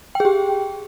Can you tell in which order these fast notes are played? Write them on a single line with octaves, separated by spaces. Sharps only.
G5 G#4 G4